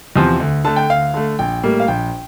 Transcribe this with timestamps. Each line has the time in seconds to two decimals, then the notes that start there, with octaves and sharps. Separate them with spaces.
0.16 E2 C3 F3
0.40 D2
0.64 D3 A3 A5
0.76 G5
0.90 D2 F5
1.14 D3 A3
1.39 A#1 G5
1.64 A2 G3 A#3
1.80 F5
1.88 A#1 G5